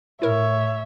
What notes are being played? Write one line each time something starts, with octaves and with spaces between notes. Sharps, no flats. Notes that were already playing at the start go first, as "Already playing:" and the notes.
A2 E4 A#4 C#5 E5